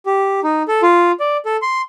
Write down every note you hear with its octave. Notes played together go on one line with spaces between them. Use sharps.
G4
D#4
A4
F4
D5
A4
C6